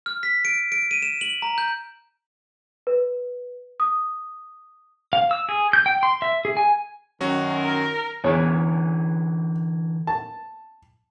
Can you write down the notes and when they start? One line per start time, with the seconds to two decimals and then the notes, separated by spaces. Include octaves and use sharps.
0.06 F6
0.23 B6
0.45 D7
0.72 D7
0.91 D#7
1.02 E7
1.21 F#7
1.42 A#5
1.58 G6
2.87 B4
3.80 D#6
5.13 F5
5.31 E6
5.49 G#4
5.73 G6
5.86 G5
6.03 C6
6.22 E5
6.45 G#4
6.57 G#5
7.20 F#2 D#3 F#3 C#4 F#4
7.52 A#4
8.24 E2 D3 E3 C#5
10.07 A5